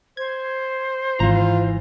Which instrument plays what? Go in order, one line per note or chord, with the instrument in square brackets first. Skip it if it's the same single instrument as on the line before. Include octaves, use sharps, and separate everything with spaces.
[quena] C5 [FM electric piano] G#6
[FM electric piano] G#1 [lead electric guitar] E3 A#5 [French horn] F4